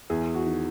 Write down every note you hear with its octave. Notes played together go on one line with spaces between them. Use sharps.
E2 G#4
F#4
D#3